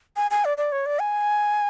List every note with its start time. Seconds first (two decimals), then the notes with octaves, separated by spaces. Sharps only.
0.16 G#5
0.31 G#5
0.45 D5
0.57 D5
0.72 C#5
0.86 D5
0.99 G#5